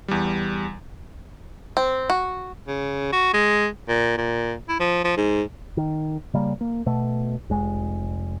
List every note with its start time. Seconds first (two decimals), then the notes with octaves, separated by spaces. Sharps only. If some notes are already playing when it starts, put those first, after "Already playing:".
0.08 E2 G3
1.77 C4
2.10 F#4
2.67 C#3
3.12 F#4
3.33 G#3
3.88 A#2
4.18 A#2
4.69 E4
4.80 F3
5.04 F3
5.17 G#2
5.77 D#3
6.34 C#3 G3 A#3
6.61 A#3
6.86 B2 A3
7.50 F1 G#3